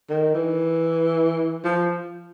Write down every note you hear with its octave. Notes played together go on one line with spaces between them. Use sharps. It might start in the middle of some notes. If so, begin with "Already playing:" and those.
D#3
E3
F3